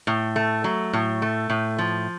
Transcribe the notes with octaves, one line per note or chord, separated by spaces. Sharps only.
A2
A3
F#3
A2
A3
A2
F3